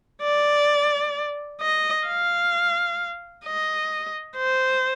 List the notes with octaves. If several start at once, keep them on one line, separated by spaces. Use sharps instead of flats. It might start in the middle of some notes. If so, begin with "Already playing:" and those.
D5
D#5
F5
D#5
C5